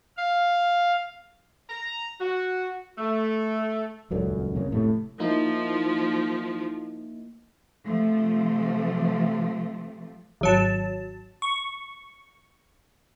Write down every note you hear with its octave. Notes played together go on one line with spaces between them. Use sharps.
F5
A#5
F#4
A3
D#1 C#2 F#2 D3
C2 C#3 A#3
F1 A2 C3 A3
F3 A#3 D#4 E4
C3 F3 A3
G#1 F#3 A5
C#6